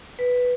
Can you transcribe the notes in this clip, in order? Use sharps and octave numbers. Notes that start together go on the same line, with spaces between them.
B4